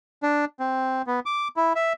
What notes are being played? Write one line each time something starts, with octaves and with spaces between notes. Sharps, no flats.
D4
C4
B3
D6
E4
E5